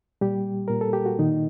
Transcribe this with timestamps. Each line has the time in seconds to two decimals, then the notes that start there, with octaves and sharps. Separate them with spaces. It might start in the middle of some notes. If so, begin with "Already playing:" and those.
0.21 A#2 G3 G4
0.68 A#2 A#4
0.81 A4
0.93 G4
1.06 F#4
1.19 A#2 D#3 D#4